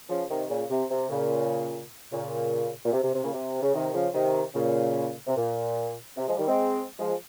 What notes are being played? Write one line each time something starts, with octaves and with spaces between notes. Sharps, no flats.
C#3 F3
C3 D#3
A#2 C#3
C3
C3
A#2 C#3
A#2 C#3
A#2
C3
C3
C3
A#2 C#3
C3
C#3
C3 D#3
C#3 F3
C3 D#3
A#2 C#3
C3
A#2
C3
F3 G#3
D#3 G3
G#3 C4
F3 G#3